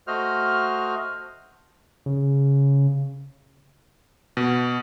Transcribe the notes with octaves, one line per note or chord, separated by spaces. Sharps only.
A3 F#4 C5 D#5 F6
C#3
B2